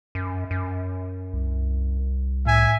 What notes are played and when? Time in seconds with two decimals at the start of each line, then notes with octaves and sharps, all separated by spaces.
0.15 F#2
0.51 F#2
1.33 C2
2.46 A2 E5 G#5